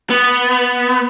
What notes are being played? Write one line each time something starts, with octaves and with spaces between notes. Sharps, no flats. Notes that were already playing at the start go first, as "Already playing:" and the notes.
B3